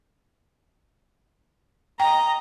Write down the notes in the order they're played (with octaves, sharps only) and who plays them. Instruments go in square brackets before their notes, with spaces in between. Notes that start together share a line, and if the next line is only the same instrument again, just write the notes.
[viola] D#5 A#5 [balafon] G5